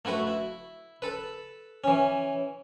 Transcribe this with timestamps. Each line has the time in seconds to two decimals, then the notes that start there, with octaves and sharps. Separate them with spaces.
0.05 A3 E4 F#4 B4
0.27 E4
1.02 A4 B4
1.84 E3 C#4